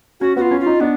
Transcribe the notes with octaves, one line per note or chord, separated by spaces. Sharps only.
C#4 F#4
B3 F#4
F4
C#4
F4
D#4
B3 D4